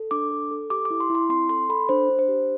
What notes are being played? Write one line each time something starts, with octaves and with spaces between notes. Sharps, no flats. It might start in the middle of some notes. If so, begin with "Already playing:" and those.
Already playing: A4
D4 D6
A4
A4
G4 D6
D6
E4
C6
E4
C6
C4 C6
A4 C6
A4 B5
D4 C5
D4
C5
G4